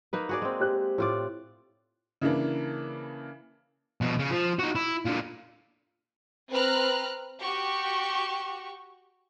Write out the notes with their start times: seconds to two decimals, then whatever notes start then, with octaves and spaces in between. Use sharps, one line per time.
0.13 A#3 D#4 B4
0.29 F#4 G#4 D5
0.42 G#3 C4
0.60 G4 C5 F#6
0.98 A2 F4 D5
2.21 C#3 E3 A#3 D4
4.01 B2 F3
4.19 C#3
4.31 F3
4.59 D#4 F#4
4.76 E4
5.06 A#2 D3
6.52 C4 B4 A#5 F6 F#6
7.41 F#4 G4 C#6